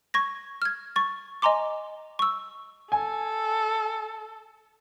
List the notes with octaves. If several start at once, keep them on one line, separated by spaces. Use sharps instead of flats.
C#6 G#6 A#6
F6 G#6
C#6 A6
D#5 G#5 A#5 C6 D6
C#6 E6
A4 G#5